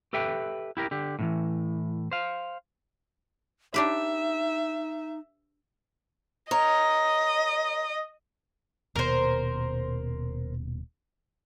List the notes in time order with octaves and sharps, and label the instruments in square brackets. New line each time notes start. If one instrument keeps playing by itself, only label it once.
[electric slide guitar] G4 A4 B4 E5 G5
E4 G4 A#4
D3 G4
A2 C#3 E3
C5 F5
[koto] D4 G4 B4 [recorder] D#4 [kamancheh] E5
[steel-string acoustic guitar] A#4 C#5 [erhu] D#5
[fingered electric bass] D#1 B2 [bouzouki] A#4 C5